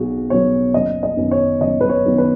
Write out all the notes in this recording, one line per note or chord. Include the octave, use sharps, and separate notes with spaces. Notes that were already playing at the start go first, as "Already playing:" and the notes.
Already playing: B1 B2 B3 F#4 G#4
B2 F#3 B3 C#5
F#1 D#5
D#5
F#2 D#3 B3
C#5
F#1 D#5
B4
C#5
F#2 D#3 B3
B4